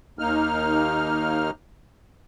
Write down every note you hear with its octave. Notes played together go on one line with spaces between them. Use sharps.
D#2 A#3 D#4 F6